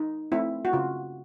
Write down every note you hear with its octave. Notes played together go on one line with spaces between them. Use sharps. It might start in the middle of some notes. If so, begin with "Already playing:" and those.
Already playing: D#4
A3 C4 E4
F#4
C#3 F4